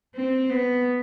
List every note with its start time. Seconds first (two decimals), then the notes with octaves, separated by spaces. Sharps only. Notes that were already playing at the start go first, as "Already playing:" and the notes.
0.15 C4
0.49 B3